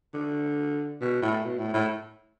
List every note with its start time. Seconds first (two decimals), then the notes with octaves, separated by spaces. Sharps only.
0.14 D3
1.01 B2
1.22 A2
1.45 B2
1.58 A2
1.74 A2